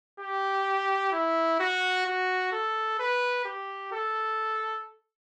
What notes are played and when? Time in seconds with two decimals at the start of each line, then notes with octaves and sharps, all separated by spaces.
0.20 G4
1.12 E4
1.60 F#4
2.06 F#4
2.52 A4
2.99 B4
3.45 G4
3.92 A4